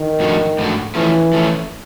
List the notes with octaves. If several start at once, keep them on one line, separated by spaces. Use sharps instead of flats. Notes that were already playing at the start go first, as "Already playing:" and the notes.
Already playing: D#3
G#2 F3 A3 D4 F#4
G#2 F3 A3 D4 F#4
E3 F3 A3 C#4
F3 A3 C#4